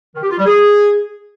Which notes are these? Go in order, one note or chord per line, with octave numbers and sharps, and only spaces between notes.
D#3
G4
F4
G3
G#4